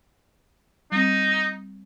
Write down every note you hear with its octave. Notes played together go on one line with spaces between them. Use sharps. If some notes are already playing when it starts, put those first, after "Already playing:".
G3 C4 D#4